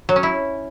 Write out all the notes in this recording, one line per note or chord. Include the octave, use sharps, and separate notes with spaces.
F#3
C#4
E4